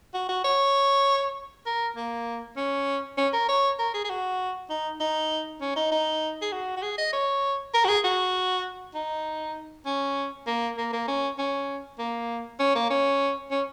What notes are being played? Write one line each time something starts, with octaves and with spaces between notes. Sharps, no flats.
F#4
F#4
C#5
A#4
A#3
C#4
C#4
A#4
C#5
A#4
G#4
G#4
F#4
D#4
D#4
C#4
D#4
D#4
G#4
F#4
F#4
G#4
D#5
C#5
A#4
F#4
G#4
F#4
D#4
C#4
A#3
A#3
A#3
C#4
C#4
A#3
C#4
A#3
C#4
C#4